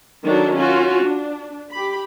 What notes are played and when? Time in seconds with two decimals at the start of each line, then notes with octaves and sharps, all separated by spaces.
0.24 D#3 F#3 D4 F#4 A4
0.55 C#4 F4 F#4
1.02 D4
1.71 G4 B5